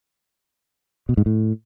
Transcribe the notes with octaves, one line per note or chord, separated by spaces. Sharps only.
B2
G#2
A2